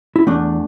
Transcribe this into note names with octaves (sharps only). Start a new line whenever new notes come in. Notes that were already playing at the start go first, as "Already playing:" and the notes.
E4
E2 A3 D4